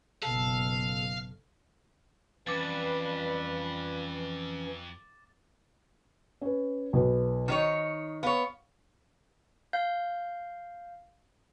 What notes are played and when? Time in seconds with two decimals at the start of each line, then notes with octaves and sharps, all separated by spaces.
0.22 F#1 B2 A4 F5
2.47 F2 E3 F3 G3 C#4 B4 D6 A6
6.41 C#4 B4
6.93 B1 B4
7.48 D#3 D#4 C5 C#5
8.23 B3 C#5 F5
9.73 F5 G6